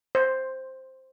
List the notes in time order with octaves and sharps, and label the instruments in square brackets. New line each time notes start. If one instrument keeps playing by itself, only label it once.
[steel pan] C5